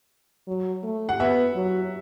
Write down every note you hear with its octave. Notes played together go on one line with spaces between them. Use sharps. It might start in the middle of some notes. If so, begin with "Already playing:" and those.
F#3
A3
F#5
B3 E5
F#3